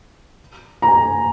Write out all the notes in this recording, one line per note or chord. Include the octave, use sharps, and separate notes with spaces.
A#5
G#5